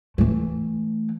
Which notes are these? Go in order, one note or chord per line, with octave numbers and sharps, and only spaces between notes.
E3 A3